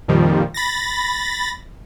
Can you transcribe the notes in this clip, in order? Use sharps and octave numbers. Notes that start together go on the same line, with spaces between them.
F2 A#2 D#3 F3 G3
B5 A6 A#6